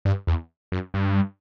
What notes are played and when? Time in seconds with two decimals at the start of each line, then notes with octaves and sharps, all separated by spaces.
0.05 G2
0.27 E2
0.72 F#2
0.94 G2